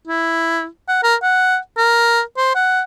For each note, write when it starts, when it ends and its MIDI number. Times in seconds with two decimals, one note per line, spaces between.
0.08 0.65 64
0.89 1.02 78
1.03 1.15 70
1.23 1.57 78
1.77 2.21 70
2.38 2.54 72
2.55 2.82 78